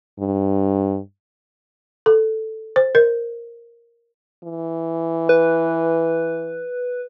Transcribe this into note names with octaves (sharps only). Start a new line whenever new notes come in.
G2
A4
C5
A#4
E3
B4